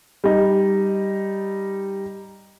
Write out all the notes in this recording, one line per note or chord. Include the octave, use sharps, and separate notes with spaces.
G3 D#4